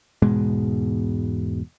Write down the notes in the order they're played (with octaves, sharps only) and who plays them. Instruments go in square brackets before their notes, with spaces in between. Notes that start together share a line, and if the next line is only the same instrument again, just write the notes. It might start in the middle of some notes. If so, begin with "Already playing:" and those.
[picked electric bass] E1 G#2 B2 G#3